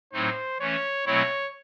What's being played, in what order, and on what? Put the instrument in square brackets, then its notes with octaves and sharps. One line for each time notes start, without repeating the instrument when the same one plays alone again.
[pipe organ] A2 F#3 A3 C4 D#4 [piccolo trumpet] C5
[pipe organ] E3 A3 C#4 [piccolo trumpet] C#5
[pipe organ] B2 F#3 A3 C4 E4 [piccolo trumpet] C#5